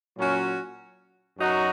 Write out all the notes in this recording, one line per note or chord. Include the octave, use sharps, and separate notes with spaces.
A#2 F#3 C#4 F#4
F#2 F#3 D#4 F#4